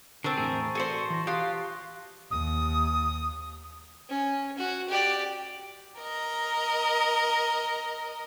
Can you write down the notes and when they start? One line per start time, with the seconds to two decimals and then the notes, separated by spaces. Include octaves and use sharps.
0.24 D3 C4 A#4 A5 C#6 A6
0.37 E2 A2 G#4
0.75 F#4 G#4 A4 C5 D5
1.10 E3 C6 A#6
1.27 F4 G4 D#6 F#6 C7
2.31 D#2 D#6
4.09 C#4
4.58 F#4
4.89 G4 D5
6.00 A#4 D#5